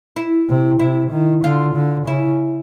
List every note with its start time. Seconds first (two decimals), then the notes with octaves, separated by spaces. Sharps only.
0.16 E4
0.49 C3
0.80 C3 E4
1.11 D#3
1.44 D3 F4
1.75 D3
2.07 C#3 E4